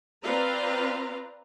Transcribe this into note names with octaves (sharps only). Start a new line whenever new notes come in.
C4 F4 B4 D5 F5 A#5